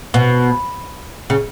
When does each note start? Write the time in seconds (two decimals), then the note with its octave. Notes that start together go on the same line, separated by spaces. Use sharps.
0.14 B2
1.30 C#3